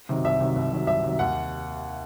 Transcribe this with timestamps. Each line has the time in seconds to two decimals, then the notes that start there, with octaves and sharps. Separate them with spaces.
0.09 C3 D#3 F#3
0.24 C2 E5
0.40 C3 D#3 F#3
0.56 C2
0.72 C3 D#3 F#3
0.87 C2 E5
1.03 C3 D#3 F#3
1.19 D#2 F#5